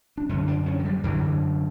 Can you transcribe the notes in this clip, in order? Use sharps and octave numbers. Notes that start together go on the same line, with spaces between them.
D4
F#2 D3 C#4
D4
C#4
F#3
G3
F#2 D3 E3